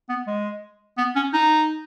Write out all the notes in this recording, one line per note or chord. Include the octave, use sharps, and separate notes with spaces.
B3
G#3
B3
C#4
D#4